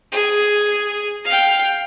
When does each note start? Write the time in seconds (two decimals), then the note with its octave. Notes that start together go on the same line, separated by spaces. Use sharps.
0.12 G#4
1.25 F5 G5